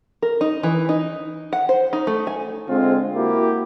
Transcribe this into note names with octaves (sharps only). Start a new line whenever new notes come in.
A#4
D#4
E3
D#4
F#5
C5
D#4
A3
G#5
D3 G#3 C4 F4
A#3 E4 F#4 G4